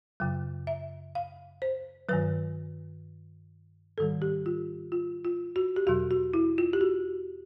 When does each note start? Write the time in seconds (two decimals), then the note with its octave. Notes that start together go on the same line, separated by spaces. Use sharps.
0.20 F#2 C#3 F#3
0.67 E5
1.15 F5
1.62 C5
2.09 G2 D#3 F#3 B4
3.98 G#2 D#3 G3 A4
4.22 G4
4.46 F4
4.92 F4
5.24 F4
5.56 F#4
5.76 G4
5.87 E2 B2 F#3 F#4
6.11 F#4
6.34 E4
6.58 F4
6.73 G4
6.81 F#4